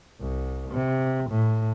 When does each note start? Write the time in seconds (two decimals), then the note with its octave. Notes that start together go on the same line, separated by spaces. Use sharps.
0.20 C2
0.71 C3
1.30 A2